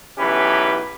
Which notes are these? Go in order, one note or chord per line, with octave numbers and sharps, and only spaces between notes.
B1 E3 C#4 G4 B4